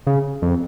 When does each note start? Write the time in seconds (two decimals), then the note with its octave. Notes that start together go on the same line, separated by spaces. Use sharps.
0.07 C#3
0.42 F2